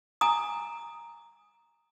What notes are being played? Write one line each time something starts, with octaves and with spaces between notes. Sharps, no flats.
G#5 A#5 D#6